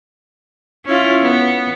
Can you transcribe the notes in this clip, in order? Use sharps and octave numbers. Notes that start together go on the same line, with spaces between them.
C#4 E4 F4
B3